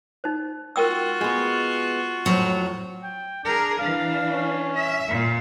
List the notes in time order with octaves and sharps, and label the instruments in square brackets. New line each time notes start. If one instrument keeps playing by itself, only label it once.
[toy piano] D#4 C5
[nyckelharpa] F4 F#4 [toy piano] A#4 G5 E6
[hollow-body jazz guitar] G#3 B3
[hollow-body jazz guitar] F2 A2 [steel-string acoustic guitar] F#3
[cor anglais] G5
[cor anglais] D4 [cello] G#4 A#4
[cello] E3 D4 [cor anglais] F5
[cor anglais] C#4
[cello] E5
A#2